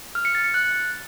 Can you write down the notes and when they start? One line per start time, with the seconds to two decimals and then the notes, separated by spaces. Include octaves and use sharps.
0.15 F6
0.25 C#7
0.35 A6
0.44 C#7
0.54 F#6